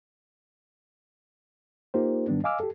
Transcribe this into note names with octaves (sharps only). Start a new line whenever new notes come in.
A#3 D#4 F4 G4 A#4 C5
G#2 D#3 G3 B3 D4
D#5 F5 G#5 D6 E6 F6
G4 A4